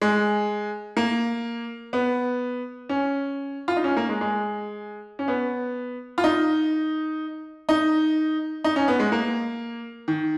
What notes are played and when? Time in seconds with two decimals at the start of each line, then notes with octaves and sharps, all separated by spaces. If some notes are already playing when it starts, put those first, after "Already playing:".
0.02 G#3
0.97 A#3
1.93 B3
2.89 C#4
3.68 F4
3.76 D#4
3.84 C#4
3.97 A#3
4.09 G#3
4.21 G#3
5.19 C#4
5.28 B3
6.18 F4
6.24 D#4
7.69 D#4
8.64 D#4
8.76 C#4
8.88 B3
9.00 G#3
9.12 A#3
10.08 D#3